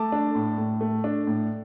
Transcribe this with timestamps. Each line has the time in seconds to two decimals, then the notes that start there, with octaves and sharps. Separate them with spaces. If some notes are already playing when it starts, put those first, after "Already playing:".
Already playing: A3 A5 D6
0.12 D4
0.35 A2
0.58 A2
0.81 A3
1.04 D4
1.27 A2